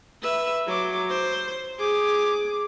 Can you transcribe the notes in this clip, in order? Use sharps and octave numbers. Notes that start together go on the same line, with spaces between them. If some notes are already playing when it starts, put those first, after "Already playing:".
B4 E5
F#3 D6
C5
G#4 D6